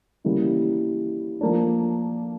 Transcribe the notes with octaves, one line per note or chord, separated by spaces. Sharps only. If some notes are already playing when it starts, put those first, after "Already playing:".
C#3 E3 G3 A#3
F3 A#3 D4